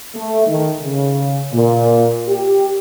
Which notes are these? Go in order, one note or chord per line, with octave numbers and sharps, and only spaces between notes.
A3
D#3
C#3
A#2
G4